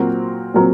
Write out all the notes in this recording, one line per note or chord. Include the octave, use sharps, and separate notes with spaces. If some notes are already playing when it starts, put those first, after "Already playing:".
Already playing: A#2 F#3 C4 F#4 A#4
A#2 F#3 C4 F#4 A#4